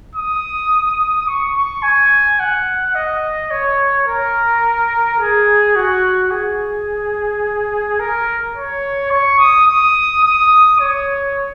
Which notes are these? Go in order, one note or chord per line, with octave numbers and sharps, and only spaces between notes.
D#6
C#6
C#6
G#5
F#5
D#5
C#5
A#4
G#4
F#4
G#4
A#4
C#5
C#6
D#6
D#6
D#6
C#5